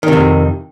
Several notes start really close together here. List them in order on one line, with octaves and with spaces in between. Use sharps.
D#3 C3 F2